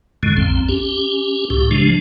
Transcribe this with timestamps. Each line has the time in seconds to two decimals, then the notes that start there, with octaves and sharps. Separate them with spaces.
0.23 F#2 A2 D3 G#3
0.37 A#1 F2 C4
0.69 C#4 G4
1.50 C#2 A2 G4
1.71 C#3 F3 G#3 D4